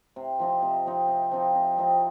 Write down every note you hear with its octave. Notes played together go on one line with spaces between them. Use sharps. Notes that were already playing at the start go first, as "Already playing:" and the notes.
C3
F3 C4 D#4
C3
F3 C4 D#4
C3
F3 C4 D#4
C3
F3 C4 D#4